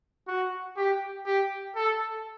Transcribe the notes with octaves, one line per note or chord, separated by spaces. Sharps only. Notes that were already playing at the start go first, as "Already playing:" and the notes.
F#4
G4
G4
A4